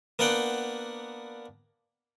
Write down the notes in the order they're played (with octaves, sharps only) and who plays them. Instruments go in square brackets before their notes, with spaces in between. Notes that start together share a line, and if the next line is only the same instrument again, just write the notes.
[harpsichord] A#3 B3 D4 F#5 G5